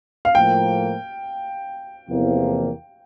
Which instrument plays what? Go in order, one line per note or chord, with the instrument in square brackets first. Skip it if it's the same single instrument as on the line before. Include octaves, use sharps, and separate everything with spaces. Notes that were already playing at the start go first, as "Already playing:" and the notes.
[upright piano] F5
[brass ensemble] A2 F3 A#3 [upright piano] G5
[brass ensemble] E2 C3 F3 A#3